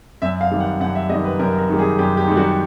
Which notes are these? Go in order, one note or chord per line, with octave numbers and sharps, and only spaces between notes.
F#2 E5
F5
D#3 G3
F#5
F#2 F#5
E5
G3 D#5
D#3
B4
F#2 A#4
A#4
D#3 G3 G4
G#4
F#2 G4
G4
D#3 G3
F#4